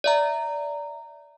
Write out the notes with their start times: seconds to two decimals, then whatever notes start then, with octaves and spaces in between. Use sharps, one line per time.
0.04 D5 E5 A#5